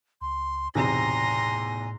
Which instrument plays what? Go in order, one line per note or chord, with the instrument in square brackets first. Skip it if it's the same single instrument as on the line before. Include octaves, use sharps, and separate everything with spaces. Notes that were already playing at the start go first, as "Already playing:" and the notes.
[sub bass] C#2 [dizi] C6
[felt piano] B1 E2 C3 [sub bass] A2 [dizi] G#5 [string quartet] A#5 C6 A#6